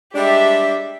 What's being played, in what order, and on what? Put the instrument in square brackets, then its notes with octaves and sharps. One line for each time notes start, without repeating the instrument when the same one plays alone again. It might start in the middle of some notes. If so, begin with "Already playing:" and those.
[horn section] G3 G#3 D4 [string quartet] G4 E5